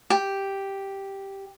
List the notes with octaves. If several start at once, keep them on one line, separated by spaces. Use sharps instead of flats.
G4